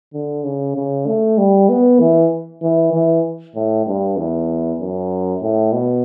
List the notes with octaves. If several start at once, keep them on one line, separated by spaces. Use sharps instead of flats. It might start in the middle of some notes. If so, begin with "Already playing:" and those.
D3
C#3
C#3
A3
G3
B3
E3
E3
E3
A2
G2
E2
F#2
A2
B2